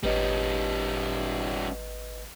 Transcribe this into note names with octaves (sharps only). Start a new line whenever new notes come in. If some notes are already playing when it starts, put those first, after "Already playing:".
G#1 G3 C#4 B4 D#5